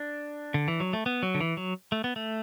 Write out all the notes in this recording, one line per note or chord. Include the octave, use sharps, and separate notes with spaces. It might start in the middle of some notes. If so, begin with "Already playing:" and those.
Already playing: D4
D3
E3
F#3
A3
B3
F#3
D3
E3
F#3
A3
B3
A3